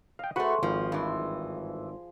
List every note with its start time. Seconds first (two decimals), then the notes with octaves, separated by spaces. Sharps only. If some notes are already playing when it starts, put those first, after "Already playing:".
0.19 D#5 F5 G5
0.36 A3 F#4 G#4 B4 C5 D#5 F#5
0.63 G#1 F3
0.92 G2 E3 F3 C6